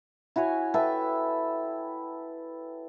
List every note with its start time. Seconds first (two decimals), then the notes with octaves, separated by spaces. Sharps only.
0.36 E4 F#4 C#5 G#5
0.74 A4 B4 E5 G5